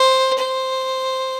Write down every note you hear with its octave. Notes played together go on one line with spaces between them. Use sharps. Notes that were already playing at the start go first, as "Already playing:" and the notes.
Already playing: C5
C5